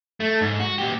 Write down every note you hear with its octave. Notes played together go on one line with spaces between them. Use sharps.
A3
G#2
F#4
A#2 G4